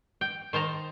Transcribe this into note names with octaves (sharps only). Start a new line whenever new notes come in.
G5
D#3 C5 A5 A#5